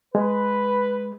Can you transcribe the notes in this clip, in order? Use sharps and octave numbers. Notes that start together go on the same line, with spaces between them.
G#3 B4